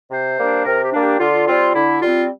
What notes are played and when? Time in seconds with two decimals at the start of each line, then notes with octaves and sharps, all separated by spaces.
0.11 C3 C5
0.38 G3 A#3 D4
0.65 C3 A#4
0.84 G4
0.93 G3 A#3 D4
1.02 G4
1.20 D3 F4
1.47 G3 C4 F4
1.75 D3 E4
2.02 G3 C4 F4